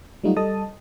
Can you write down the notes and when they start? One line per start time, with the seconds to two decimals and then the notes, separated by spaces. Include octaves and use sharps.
0.24 F#3 G3 A3 D#4 F4 F#4
0.37 G3 A4 D#5 A5 D#6